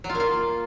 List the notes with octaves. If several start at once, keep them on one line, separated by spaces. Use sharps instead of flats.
F#3
F4
A#3
F4